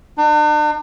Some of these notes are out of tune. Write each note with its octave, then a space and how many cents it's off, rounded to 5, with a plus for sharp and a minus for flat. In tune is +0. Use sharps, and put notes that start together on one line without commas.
D4 +45